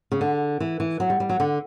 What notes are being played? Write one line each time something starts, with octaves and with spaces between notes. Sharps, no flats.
C#3
D3
E3
E3
F#3
G3
G3
F#3
D3